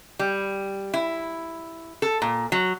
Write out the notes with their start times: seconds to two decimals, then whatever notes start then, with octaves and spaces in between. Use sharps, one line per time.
0.19 G3
0.94 E4
2.02 A4
2.22 A#2
2.52 F#3